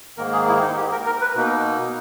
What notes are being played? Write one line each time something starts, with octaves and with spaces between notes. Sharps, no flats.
G#2 D#3 A#3 A#4
G#4
E4
D#4
G4
A#4
A#4
B4
B2 A#3 D#4